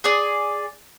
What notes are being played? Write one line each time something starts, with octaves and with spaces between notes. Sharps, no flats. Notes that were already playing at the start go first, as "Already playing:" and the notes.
G#4 D5